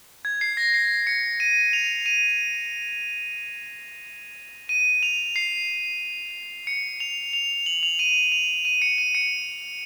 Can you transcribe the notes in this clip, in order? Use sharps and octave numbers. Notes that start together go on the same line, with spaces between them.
G#6
C7
A#6
C7
C#7
D#7
F7
D#7
D#7
F7
C7
C#7
F7
F7
F#7
F7
D#7
F7
D#7
C#7
D#7
C#7